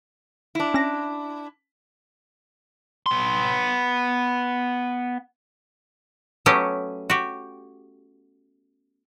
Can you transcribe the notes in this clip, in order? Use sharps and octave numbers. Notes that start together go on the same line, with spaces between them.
D4 E4
C#4 A#6
B3 C6
F#3 A3 B3 C#4 G4
F#4 G4